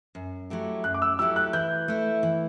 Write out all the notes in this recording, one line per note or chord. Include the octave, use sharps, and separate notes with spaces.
F#2
F#3 A3 E4 G4
F#2 F#6
D6
E6
F#3 A3 E4 G4 E6
F#6
E3 G6
A3 E4
E3